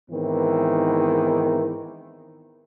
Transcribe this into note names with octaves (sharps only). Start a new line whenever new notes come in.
G#2 D#3 E3 B3 C4 E4